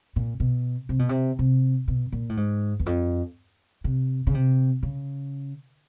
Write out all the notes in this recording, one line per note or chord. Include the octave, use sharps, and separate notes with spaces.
A#2
B2
C3
B2
C3
C3
B2
A#2
A2
G#2
E2
F2
C3
C#3
C3
C#3